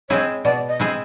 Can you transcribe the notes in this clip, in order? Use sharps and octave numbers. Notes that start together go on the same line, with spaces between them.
G#3 C4 E4 G#4 C#5
B2 D5
D#5
G#3 C4 E4 G#4